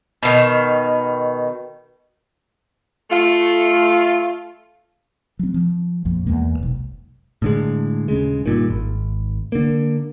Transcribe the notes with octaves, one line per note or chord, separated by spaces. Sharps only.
B2 D#3
A3 F4
F#3 C4
F3
A#1 F2 A#2
E2 G#3 A#3
F1 B1
A2 D3 G#3
D#1 C#3 G#3
G2 A#2 D#3
G#1
D3 A#3